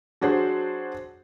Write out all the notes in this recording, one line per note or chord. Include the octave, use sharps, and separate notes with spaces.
F#3 D4 F#4 G#4 C5